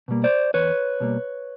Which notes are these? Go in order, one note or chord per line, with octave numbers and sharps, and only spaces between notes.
B2 G3 A#3
C5 D5
E2 B4 C#5
B2 G3 A#3